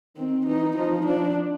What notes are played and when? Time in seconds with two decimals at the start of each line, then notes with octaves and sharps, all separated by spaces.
0.16 D#3 C4
0.46 E3 D#4
0.76 F3 D#4
1.06 F3 D4